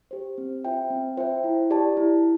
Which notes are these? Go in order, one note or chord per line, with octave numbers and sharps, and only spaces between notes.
G4 C5
C4
F4 C5 E5 G5
C4
F4 C5 E5 G5
E4
G4 D5 A5
E4